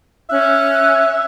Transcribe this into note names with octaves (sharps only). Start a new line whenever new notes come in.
C#4 E5 F#6